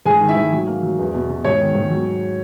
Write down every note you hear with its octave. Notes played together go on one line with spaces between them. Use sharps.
G#2 G#4 G#5
D#3
E4 E5
G#2
F#3
A#3
F#3
E2
B2
B2
G#2 C#5
D#3
G#2
F#3